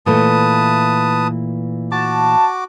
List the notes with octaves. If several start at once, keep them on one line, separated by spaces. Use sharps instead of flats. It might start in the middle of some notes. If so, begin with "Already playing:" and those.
A#2 E3 A3 B4 A5 D#6
F#4 A5 D6